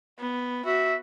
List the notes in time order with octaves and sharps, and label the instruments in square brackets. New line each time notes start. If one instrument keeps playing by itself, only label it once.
[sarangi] B3
[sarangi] F#4 [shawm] E5